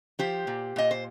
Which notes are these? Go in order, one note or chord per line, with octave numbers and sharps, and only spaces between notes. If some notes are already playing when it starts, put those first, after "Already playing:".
F3 G4 C5
A#2
A#2 D#5
C5